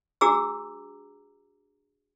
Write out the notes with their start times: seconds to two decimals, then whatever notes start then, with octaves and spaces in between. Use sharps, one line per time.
0.21 D4 F#4 G#4 A#5 D6 E6